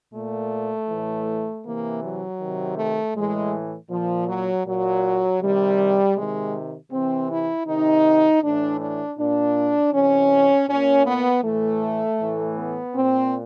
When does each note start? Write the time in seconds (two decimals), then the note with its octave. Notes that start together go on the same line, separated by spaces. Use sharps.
0.13 A#2 A3
0.89 A2 E3
1.64 C3 E3 A#3
2.02 F#3
2.40 C3 D#3
2.78 A3
3.15 A2 E3 G#3
3.91 A#2 F3
4.28 F#3
4.66 A#2 F#3
5.41 C3 D#3 G3
6.16 C3 D#3 G#3
6.92 C3 E3 C4
7.30 E4
7.67 C3 D#3 D#4
8.43 A2 E3 D4
8.80 D4
9.18 A#2 D4
9.93 C3 E3 C#4
10.69 A#2 C#4
11.06 B3
11.44 A2 E3 A3
12.20 A2 E3
12.57 B3
12.95 A#2 C4